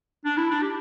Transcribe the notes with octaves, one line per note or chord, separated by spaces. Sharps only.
D4
E4
D4
G4